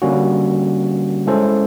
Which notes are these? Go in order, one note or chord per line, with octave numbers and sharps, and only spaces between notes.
D3 G3 A#3 C#4 F#4
G#3 C#4 E4 A4 C5